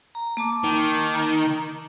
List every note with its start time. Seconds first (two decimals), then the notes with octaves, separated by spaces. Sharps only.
0.15 A#5
0.37 A#3 A5 D6
0.64 D#3